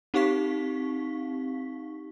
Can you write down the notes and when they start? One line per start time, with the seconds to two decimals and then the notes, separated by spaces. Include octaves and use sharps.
0.14 C4 D#4 G4 F5 C#6 B6